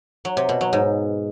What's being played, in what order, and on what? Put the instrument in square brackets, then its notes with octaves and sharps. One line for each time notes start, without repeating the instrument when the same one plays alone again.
[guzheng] F#3
C3
B2
F#3
G#2